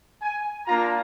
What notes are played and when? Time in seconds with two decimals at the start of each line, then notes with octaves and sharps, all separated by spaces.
0.22 G#5
0.66 A#3 D4 F4 A#5